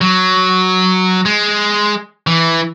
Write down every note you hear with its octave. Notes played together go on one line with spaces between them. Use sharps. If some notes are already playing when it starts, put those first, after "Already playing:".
F#3
G#3
E3